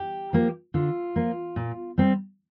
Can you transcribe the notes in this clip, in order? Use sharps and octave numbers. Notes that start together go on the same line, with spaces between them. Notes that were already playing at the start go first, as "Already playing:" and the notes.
Already playing: G4
F3 A#3
D3 F4
F3 A#3
A#2
G3 C4